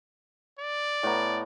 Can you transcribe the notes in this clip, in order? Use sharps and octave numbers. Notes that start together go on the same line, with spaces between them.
D5
A2 B3 A#5